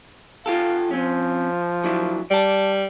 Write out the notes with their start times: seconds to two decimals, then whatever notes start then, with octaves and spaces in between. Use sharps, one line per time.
0.46 F4 G4 A4 F5
0.91 F3 C4 C#4
1.84 F#3 D4 E4
2.30 G3 D5 A5